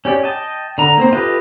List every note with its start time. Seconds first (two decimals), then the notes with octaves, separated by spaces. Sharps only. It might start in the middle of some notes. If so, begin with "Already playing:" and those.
0.05 C#4 G4 D5
0.23 D#5 G5 A5
0.78 D3 A#5
0.98 A#3 C4 C5
1.13 F4 G4 A4 B4 D#5